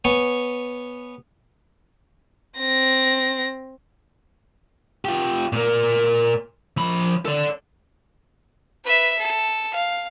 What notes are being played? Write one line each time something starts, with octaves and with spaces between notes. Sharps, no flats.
B3 C#5 G#5
C4 A#6
F4 G4
A#2 A#3
F3 B5
A4 D5
B4 E5
A4
F5